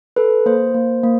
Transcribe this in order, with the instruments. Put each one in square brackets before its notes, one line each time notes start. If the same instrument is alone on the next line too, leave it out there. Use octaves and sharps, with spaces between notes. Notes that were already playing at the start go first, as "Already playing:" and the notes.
[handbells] A4 B4
A#3 C5
A#3
A#3